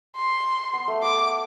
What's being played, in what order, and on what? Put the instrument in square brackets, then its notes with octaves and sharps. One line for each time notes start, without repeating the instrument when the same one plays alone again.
[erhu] C6
[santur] B3
A3
[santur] B3 [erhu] D6